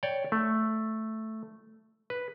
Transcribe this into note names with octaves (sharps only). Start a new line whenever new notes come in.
C#5 D5 G5
A3
B4